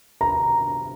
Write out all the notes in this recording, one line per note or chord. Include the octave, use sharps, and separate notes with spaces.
A#5